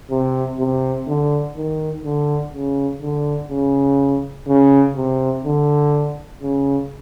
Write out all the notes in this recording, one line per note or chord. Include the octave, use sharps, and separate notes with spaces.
C3
C3
D3
D#3
D3
C#3
D3
C#3
C#3
C3
D3
C#3